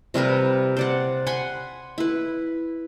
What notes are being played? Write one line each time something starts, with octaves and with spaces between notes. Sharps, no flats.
C3 G3 A#4 B4
C5 D5 F#5
F#5 G#5 B5 C6
E4 B4